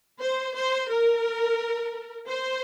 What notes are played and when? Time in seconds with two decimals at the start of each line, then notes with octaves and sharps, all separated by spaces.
0.20 C5
0.56 C5
0.90 A#4
2.27 C5